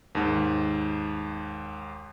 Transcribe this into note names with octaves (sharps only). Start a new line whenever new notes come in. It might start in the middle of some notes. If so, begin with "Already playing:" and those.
D#2 G#2